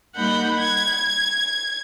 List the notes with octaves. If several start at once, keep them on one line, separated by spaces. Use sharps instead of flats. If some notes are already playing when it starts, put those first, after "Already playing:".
G3 A#3 D#4 F#5 B5 G6
G#6